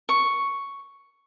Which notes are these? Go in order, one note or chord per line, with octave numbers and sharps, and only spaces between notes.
C#6